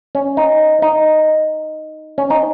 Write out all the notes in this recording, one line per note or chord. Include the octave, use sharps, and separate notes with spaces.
C#4
D#4
D#4
C#4
D#4